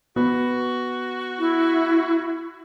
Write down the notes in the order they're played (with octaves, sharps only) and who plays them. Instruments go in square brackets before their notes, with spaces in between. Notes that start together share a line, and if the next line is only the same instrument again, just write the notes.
[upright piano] B3 [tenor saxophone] F#4
[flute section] E4